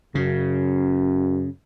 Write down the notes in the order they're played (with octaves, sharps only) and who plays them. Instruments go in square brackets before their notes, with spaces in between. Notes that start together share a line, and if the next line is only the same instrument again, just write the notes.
[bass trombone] F#2 [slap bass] C#3